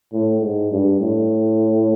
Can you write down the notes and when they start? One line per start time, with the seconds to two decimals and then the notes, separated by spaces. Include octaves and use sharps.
0.13 A2
0.42 G#2
0.72 G2
1.00 A2